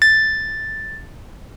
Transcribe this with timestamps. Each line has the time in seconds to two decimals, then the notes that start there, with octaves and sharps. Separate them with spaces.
0.02 A6